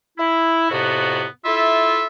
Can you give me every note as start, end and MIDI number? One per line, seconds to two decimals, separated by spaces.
0.18 0.66 64
0.71 1.25 41
0.71 1.25 45
0.71 1.25 48
0.71 1.25 59
0.71 1.25 66
1.44 2.07 64
1.44 2.07 65
1.44 2.07 69
1.44 2.07 76